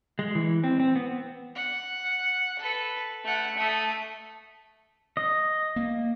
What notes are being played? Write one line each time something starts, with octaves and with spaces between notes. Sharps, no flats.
G#3
E3
C4
C4
B3
F#5
A4 B4
A3 F#5
A3 D#6
D#5
A#3